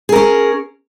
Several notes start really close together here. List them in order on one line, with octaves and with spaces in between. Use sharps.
G#4 A#4 C#4